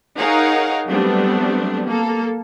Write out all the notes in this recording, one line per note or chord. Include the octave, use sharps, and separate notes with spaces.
D#4 G#4 A#4 C#5 F5 F#5
F#3 G3 A3 B3 C4 D4
A#3 A4